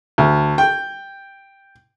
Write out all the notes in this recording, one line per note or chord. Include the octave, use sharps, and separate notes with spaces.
D2
G5